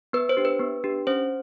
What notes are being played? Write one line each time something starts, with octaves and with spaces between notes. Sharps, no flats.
B3 B4
C5
D4 G4
B4
B3
D4 G4
C#4 C5